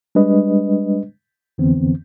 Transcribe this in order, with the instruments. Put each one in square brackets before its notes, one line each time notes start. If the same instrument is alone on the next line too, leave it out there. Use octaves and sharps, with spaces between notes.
[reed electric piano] G3 G#3 D4 B4 D#5
F2 D3 E3 B3 C4